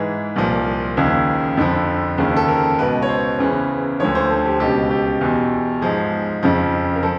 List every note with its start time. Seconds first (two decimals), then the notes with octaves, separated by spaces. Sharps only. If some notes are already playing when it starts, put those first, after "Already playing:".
Already playing: G#2 E3 G#4
0.36 C2 A#2 F3
0.97 D#2 C#3 F3 G#4
1.57 F2 D3 F3
2.17 D#2 C#3 F3
2.36 A4
2.48 A#4
2.78 C#2 B2 B4
3.02 C#5
3.09 C5
3.39 E2 C#3 E3
4.00 D2 D3 F3 C#5
4.15 C5
4.30 A4
4.46 G4
4.60 C#2 B2 G4
4.90 G4
5.21 E2 B2
5.82 G#2 F3 G#4
6.43 F2 C#3 F3
6.95 A#4
7.03 F3 A4